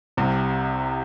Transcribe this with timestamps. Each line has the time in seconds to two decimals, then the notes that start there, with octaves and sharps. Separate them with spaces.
0.17 C2 C3